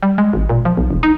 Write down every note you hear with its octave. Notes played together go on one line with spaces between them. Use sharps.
G3
G#3
G#1
A#2
F3
B1
E1
D#4